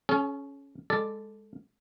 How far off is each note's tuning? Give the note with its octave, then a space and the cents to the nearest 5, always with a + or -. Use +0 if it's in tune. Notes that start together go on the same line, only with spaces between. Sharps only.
C#4 +0 G#4 +45
G#3 -15 A4 +0 D5 +0